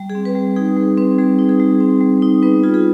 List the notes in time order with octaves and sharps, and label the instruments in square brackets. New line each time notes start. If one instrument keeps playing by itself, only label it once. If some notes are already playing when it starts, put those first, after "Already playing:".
Already playing: [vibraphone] G3
G#4
C4
B4
G3
D#4 G#4
G3
C4 B4
G3 G#4
D#4
G#4
G3
C4
G3
D#4
B3 B4
F4 G#4
G#4